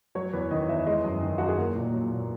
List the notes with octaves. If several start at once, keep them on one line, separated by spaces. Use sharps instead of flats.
F#3 C#5
E2 B4
D#3 D#5
E2 E5
G#3 D#5
F#2
D#3
F#2 F#4
G#4
A#3 A#4
A#2
F#3
A#2